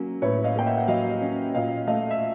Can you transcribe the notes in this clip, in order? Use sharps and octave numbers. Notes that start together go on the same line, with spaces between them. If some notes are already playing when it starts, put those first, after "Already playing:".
Already playing: F#3 A#3 C#4
A2 B4 C#5
D#5 F5
A#3 G5
E5 F#5
F#5
F#3 D#5 F5
C#4
A#2 D#5 F5
A3 D#5 F5
E5